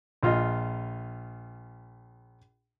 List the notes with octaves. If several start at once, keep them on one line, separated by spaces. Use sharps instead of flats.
A#1 F4 D#5